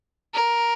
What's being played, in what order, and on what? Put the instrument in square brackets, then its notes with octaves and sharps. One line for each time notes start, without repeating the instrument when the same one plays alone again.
[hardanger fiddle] A#4